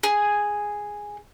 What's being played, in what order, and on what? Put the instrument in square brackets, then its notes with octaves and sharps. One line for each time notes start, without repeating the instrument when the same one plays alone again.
[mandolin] G#4